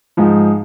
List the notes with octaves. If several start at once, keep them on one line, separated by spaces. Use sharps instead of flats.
G#2 F3 G#3 D#4